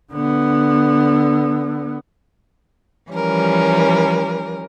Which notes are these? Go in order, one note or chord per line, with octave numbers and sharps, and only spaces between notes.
D3 B3
E3 F3 G3 C#4 A#4